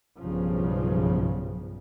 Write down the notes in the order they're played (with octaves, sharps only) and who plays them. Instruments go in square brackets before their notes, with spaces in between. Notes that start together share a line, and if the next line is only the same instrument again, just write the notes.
[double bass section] B1 G2 C#3 F3